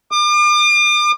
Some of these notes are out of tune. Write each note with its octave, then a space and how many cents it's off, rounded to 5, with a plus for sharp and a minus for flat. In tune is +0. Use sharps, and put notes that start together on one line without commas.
D6 +40